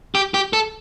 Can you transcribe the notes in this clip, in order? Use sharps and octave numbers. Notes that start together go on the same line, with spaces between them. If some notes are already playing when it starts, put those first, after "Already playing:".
G4
G4
A4